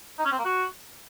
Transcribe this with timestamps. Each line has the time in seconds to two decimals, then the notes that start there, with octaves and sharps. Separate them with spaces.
0.19 D#4
0.25 C#4
0.32 C4
0.38 A#3
0.45 F#4